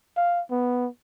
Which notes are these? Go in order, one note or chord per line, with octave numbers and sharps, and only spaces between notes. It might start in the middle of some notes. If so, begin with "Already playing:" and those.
F5
B3